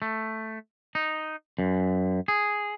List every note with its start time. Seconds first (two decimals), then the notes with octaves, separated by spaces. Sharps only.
0.02 A3
0.95 D#4
1.59 F#2
2.28 G#4